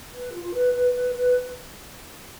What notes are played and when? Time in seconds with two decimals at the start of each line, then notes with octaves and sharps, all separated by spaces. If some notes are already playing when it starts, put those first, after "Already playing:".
0.13 B4
0.33 F4
0.53 B4
0.73 B4
0.93 B4
1.13 B4